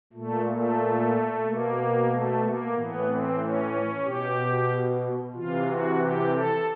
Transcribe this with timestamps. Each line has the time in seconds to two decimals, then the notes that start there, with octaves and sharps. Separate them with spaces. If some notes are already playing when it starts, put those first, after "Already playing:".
0.13 A#2 A3
0.45 A3
1.43 B2 A#3
2.08 A3
2.41 A#3
2.73 A2 E3 B3
3.06 C4
3.38 C#4
4.04 B2 G4
5.34 C3 E3 F4
5.67 F#4
5.99 G4
6.32 A4